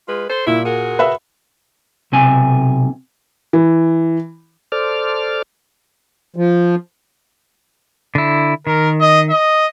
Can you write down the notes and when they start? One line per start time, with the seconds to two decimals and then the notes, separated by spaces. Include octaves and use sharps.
0.08 G#3 F4 B4
0.29 A4 C5
0.47 A#2 G3 E4
0.66 F#4 G#4 A#4
0.99 B4 E5
2.12 B1 C3 G#5
3.53 E3
4.72 A4 C5 D5 D6 F6
6.36 F3
8.15 D3 E4
8.67 D#3 A#4
9.01 D#5
9.30 D#5